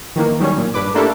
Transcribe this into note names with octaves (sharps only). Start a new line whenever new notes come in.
D#3 E3 A#3
D#3 F#3 G3 C#4 C#5
A#2
G2 B4 D6
A3 A#3 D4 E4 G4 A4